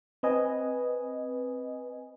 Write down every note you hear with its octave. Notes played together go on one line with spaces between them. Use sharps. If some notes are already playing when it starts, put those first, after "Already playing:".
C4 B4 D#5 G#5